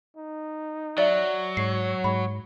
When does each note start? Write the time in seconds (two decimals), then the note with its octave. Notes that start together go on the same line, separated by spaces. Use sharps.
0.17 D#4
0.98 F#3 D5 E5
1.57 G#2 C#5 C7
2.04 G#2 B5